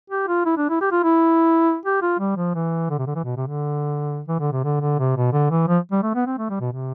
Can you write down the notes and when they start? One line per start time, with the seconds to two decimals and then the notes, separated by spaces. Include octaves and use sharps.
0.10 G4
0.28 F4
0.46 E4
0.57 D4
0.69 E4
0.81 G4
0.92 F4
1.03 E4
1.86 G4
2.02 F4
2.19 G3
2.37 F3
2.55 E3
2.90 D3
2.98 C3
3.07 D3
3.15 E3
3.24 B2
3.36 C3
3.47 D3
4.28 E3
4.40 D3
4.52 C3
4.64 D3
4.81 D3
4.99 C3
5.16 B2
5.33 D3
5.50 E3
5.68 F3
5.92 G3
6.03 A3
6.15 B3
6.26 C4
6.38 A3
6.50 G3
6.60 B2
6.73 C3